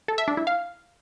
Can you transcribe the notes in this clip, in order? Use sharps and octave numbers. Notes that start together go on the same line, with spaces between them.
A4
E5
D4
E4
F5